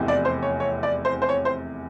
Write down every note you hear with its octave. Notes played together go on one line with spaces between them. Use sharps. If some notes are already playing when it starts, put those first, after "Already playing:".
Already playing: F1 E2 C3
D5
C5
C#5
C#5
D5
C5
C5
C#5
C5